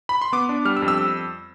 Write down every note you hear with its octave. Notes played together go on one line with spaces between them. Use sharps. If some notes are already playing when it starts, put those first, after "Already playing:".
B5
C6
B3 D6
D4
G3 F6
E6
F2
E6